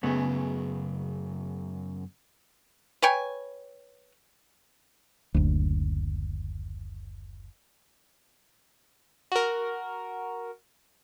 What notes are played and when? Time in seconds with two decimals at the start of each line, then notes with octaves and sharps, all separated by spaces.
0.03 F#2 C#3 A3 B3 G#4
3.02 B4 C#5 G5 G#5
5.34 F#1 D2
9.32 F#4 A#4